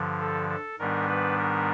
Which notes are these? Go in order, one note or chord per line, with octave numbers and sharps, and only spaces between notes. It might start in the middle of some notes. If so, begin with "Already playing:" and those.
Already playing: G2 D3 F3
A4
A4
G#2 D#3 G3 B3 D4 A#4
B4
A#4